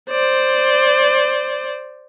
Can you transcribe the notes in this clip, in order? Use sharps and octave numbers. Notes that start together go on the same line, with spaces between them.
C5 D5